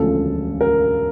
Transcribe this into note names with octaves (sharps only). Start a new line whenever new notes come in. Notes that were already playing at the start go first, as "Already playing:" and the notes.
Already playing: E1 D2 C#3 F3 A4
A#4